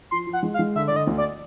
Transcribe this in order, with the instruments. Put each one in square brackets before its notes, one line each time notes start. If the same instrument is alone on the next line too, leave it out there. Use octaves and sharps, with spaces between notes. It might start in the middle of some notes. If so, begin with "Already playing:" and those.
[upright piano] F3 [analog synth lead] C6
[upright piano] F3
[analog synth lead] F#5
[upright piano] G#3
[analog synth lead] F5
[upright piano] G#3
[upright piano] D3 [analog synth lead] E5
[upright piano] D3 [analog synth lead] D5
[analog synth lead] D#5
[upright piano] D2
[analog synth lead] D5